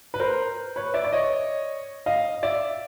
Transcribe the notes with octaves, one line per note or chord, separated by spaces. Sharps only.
B4
A#4 C5
B4 C#5
D5 E5
D5
C#5 D#5
D#5 F5
D5 E5